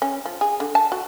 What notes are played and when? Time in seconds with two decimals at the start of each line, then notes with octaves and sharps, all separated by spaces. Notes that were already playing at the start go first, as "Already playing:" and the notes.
0.02 C#4
0.25 F3
0.41 G#4
0.60 D3
0.75 A5
0.92 F#4